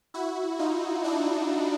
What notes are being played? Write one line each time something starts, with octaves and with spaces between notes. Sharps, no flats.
E4 F#4
D#4 F4
D4 E4